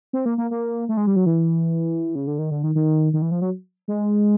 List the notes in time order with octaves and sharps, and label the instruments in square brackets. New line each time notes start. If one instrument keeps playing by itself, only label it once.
[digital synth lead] C4
A#3
A#3
A#3
A3
G#3
G3
F#3
E3
C#3
D3
D#3
D3
D#3
D#3
D#3
E3
F3
F#3
G#3